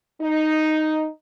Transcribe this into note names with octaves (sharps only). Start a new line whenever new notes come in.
D#4